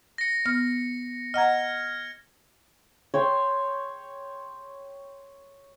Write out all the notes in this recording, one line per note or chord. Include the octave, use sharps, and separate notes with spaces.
A#6 C#7
B3 F6 C#7
D#5 F#5 A#5 F6 G#6
C#5 G5 C6